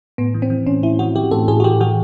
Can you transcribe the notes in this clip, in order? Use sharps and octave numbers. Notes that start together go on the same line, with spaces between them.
A2 B3
E3
C4
E3
A2 C#4
A2 E4
E3 F#4
E3 G4
A2 A4
A2 G#4
F#4
E3 G4
E3 F#4